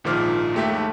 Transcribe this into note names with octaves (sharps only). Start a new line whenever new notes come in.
A#1 G#2 D#3 F3 D6 F6
D#2 G#2 A3 G4 E5